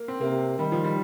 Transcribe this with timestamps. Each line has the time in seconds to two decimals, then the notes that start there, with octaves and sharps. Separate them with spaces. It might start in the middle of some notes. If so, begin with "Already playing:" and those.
Already playing: A#3
0.08 C4
0.21 C3 A#3
0.59 D#3 G3
0.72 F3
0.85 G3